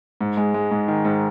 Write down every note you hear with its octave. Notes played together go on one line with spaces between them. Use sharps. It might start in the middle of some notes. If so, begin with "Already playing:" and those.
G#2
G#3
G#3
G#2
D#3
G#2